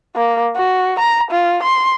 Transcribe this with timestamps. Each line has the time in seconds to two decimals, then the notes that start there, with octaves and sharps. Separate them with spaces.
0.15 A#3
0.56 F#4
0.99 A#5
1.31 F4
1.63 C6